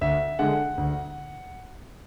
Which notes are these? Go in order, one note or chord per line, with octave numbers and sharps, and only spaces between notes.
D2 E5
D3 G#3 F#5
D2